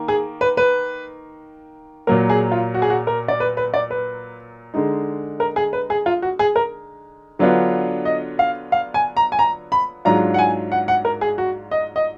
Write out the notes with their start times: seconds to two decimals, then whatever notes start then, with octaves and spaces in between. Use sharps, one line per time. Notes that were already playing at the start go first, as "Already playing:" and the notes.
Already playing: D#3 A#3
0.08 G#4
0.41 B4
0.57 B4
2.07 A#2 F#3 A#3 A#4
2.30 G#4
2.52 F4
2.74 F#4
2.82 G#4
2.90 F#4
3.07 A#4
3.28 D5
3.40 B4
3.57 B4
3.74 D5
3.91 B4
4.74 D3 G#3 D#4
5.40 A#4
5.56 G#4
5.73 B4
5.90 G#4
6.06 F4
6.22 F#4
6.39 G#4
6.56 A#4
7.39 D3 F#3 B3 D4 F4
8.05 D#5
8.39 F5
8.72 F5
8.94 G#5
9.17 A#5
9.32 G#5
9.39 A#5
9.72 B5
10.05 G#2 F#3 D4 F4 A#5
10.34 F#5
10.38 G#5
10.72 F#5
10.88 F#5
11.05 A#4
11.21 G#4
11.38 F#4
11.71 D#5
11.96 D#5